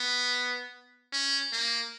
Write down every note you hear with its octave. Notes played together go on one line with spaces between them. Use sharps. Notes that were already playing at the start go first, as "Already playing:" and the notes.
Already playing: B3
C#4
A#3